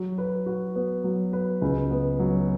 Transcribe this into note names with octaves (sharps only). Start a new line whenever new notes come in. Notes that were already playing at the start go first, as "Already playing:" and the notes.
Already playing: F#3
B4
F#4
B3
F#3
B4
C#2
B3
F#3